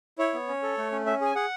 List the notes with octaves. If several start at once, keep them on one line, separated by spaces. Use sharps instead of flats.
E4 C#5
B3
C#4
A4
A3
C#4
C#4 E5
G#4 G#5
G#4 F#5